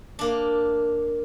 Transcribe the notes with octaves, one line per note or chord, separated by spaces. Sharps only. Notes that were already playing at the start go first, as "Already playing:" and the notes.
A#3 D4